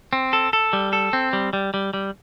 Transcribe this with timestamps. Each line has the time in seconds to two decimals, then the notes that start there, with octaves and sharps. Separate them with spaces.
0.13 C4
0.33 A4
0.53 A4
0.73 G3
0.93 A4
1.13 C4
1.33 G3
1.53 G3
1.74 G3
1.94 G3